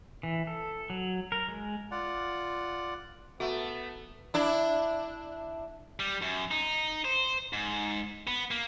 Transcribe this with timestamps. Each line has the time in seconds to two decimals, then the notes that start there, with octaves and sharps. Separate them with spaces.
0.23 E3
0.47 A4
0.90 F#3
1.32 A#4
1.49 G#3
1.91 F4 D5 F#5
3.40 A3 B3 F#4 E5 F#5 A#5 C#6
4.34 D4 E4
6.00 G3
6.22 F#2
6.51 D#4
7.05 C5
7.53 G#2
8.27 B3
8.51 A#3